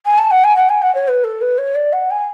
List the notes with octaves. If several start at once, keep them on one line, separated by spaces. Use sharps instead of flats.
G#5
A5
F#5
G#5
F#5
G#5
F#5
C#5
B4
A4
B4
C#5
D5
F#5
G#5